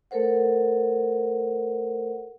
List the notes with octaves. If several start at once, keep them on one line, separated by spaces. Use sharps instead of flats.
A3 A4 A#4 C5 F#5